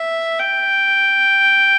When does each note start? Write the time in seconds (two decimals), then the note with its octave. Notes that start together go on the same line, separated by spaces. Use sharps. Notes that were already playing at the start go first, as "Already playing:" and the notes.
Already playing: E5
0.39 G5